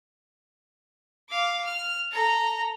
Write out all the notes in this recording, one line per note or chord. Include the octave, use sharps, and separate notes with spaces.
F5 D6
F6
A4 A#5